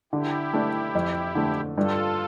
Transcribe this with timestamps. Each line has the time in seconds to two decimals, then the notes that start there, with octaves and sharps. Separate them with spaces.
0.13 D3 E4 G4
0.54 A3 D4
0.95 F2
1.35 D3 A3
1.77 G2 F4 A4